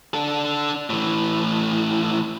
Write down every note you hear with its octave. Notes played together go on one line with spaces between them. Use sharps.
D4 A4
A2 E3